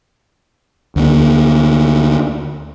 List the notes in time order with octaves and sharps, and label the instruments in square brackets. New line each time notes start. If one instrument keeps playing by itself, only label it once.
[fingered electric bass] D2 A#3